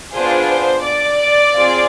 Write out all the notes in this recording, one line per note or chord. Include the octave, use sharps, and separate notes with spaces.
B3 D4 F4 G#4 C5
C5
D5
C4 F4 G#4